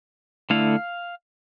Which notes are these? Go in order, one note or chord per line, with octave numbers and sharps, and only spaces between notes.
D3 A3 E4 F5